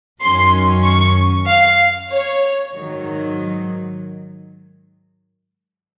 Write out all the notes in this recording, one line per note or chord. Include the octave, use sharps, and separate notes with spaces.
F#2 D#3 F#3 C#4 C6
C#6
F5
C#5
G#2 D#3 F#3